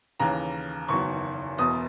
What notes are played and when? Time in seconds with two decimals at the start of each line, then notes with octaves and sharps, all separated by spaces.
0.20 D#2 C#3 E3 A#5
0.88 F#1 E2 D#3 F#3 C#6
1.58 E1 E2 B2 D#6